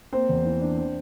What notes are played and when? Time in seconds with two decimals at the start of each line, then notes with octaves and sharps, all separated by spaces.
0.12 A#3 C4 C5
0.29 E2
0.45 E3
0.62 D4
0.77 C4